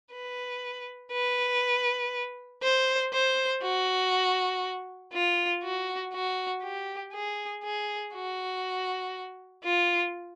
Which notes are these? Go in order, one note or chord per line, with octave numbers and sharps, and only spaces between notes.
B4
B4
C5
C5
F#4
F4
F#4
F#4
G4
G#4
G#4
F#4
F4